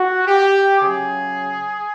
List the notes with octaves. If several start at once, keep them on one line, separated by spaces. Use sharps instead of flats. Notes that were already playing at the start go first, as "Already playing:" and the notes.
Already playing: F#4
G4
C#3 F#3 G#4